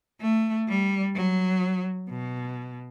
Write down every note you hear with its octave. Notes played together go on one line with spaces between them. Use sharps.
A3
G3
F#3
B2